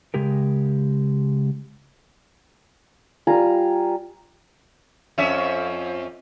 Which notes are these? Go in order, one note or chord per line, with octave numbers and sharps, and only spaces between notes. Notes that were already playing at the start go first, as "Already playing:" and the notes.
C#3 G#3 G4 A#4
G3 F4 G#5 A#5
F2 C#4 E5